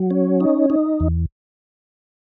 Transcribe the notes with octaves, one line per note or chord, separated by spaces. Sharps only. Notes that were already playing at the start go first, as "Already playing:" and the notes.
Already playing: F#3
C#4
D#4
D#4
E2